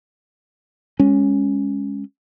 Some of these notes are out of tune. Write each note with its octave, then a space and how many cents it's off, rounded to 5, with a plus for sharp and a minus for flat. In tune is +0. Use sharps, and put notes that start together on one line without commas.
G#3 -20 C#4 +0